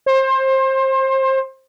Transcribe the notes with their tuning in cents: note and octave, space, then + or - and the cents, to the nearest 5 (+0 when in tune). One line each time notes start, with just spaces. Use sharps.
C5 +25